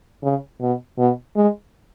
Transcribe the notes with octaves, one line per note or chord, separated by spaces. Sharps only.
C#3
B2
B2
G#3